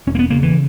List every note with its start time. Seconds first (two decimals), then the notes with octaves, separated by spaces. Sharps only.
0.07 E1 C#4
0.15 A#3
0.19 B3
0.30 C#3 A#3
0.43 E3